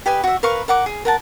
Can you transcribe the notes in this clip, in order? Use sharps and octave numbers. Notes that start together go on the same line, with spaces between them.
G4 B4 D#5 G#5
F#4 E5
A#4 B4 F5 C#6
A#4 F#5 D6
G#4
A#4 F#5 A5